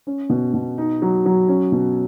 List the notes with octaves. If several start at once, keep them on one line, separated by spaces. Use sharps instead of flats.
C#4
B2
B2
D#4
F#3
F#3
C#4
B2